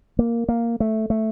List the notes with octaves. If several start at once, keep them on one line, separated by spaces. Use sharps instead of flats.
A#3
A#3
A3
A3